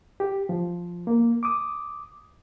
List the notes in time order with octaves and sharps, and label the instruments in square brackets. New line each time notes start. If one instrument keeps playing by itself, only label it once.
[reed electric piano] G4
F3
A#3
D6 D#6